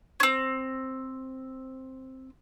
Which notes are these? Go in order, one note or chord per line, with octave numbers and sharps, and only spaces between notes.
C4 C#4